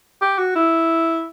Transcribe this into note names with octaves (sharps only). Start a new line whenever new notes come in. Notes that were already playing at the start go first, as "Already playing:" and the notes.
G4
F#4
E4